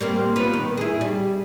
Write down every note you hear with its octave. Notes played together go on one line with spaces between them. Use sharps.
G3 A#3 C4
B3 F4 B4
D#3
E4 G#4
G3